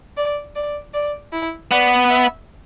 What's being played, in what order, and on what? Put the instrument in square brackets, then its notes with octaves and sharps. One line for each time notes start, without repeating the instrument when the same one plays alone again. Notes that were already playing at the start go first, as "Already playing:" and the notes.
[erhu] D5
D5
D5
E4
[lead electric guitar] B3 [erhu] D5
[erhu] E5